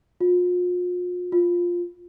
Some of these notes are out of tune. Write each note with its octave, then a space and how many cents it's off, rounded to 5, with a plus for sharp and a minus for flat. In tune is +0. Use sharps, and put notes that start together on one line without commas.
F4 +40
F4 +5